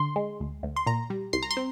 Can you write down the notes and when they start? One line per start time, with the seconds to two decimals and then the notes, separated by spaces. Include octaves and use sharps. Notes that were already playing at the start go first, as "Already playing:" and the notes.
Already playing: D3 C6
0.16 G#3
0.40 D2
0.63 D2
0.76 C6
0.86 A#2 A#5
1.10 G3
1.33 C2 C6
1.43 A#5
1.51 C6
1.57 C4